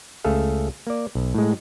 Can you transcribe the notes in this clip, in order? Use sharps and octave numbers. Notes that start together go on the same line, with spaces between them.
C#2 A3 G#4 A4 F5
A#3 D5
B1
A2 G#3